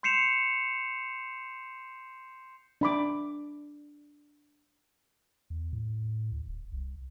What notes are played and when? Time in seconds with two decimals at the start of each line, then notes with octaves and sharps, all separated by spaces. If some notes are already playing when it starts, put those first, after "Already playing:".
0.03 C6 G6 C7 C#7 E7 F7
2.81 D4 B5 D6
5.50 E2
5.73 A2
6.32 D2
6.48 D1
6.72 C2